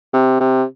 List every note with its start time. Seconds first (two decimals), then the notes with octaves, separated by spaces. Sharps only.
0.13 C3
0.40 C3